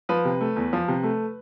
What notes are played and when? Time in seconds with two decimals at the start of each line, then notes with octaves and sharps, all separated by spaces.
0.09 F3 B4
0.25 C3
0.41 A3
0.56 E2
0.73 F3
0.88 C3
1.03 A3